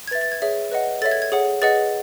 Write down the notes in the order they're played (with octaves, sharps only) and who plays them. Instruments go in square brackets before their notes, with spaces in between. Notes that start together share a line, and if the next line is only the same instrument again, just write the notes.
[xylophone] G#6
B4 A6
E5
A6
G#6
G#4 C#5 E5
B4 D#5 F#5
A4 C#5 E5 A6
G#6
G#6
G#4 C#5 F#5
G#4 B4 D#5 F#5 A6